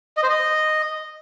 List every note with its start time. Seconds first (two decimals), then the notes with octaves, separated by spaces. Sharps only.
0.17 D#5
0.23 C5
0.29 D#5